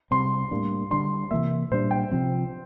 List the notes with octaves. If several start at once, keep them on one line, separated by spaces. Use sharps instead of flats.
C3 G3 C4 C6
A2 G3 A#3 D4
D3 G3 D4 C6
C3 E3 A#3 E5
A#2 G3 D4 C5
G5
C3 F3 C4